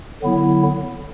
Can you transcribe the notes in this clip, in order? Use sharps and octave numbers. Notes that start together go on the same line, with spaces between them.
D3 F#3 B3 E4